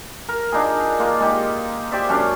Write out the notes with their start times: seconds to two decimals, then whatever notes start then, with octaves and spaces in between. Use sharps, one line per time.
0.29 A#4
0.52 D4 D#4 F4 G#4
0.99 A#3 F4
1.20 G#3 D#4 G4
1.91 G4 C5 D5 E5
2.09 F#2 C#4 D4 F5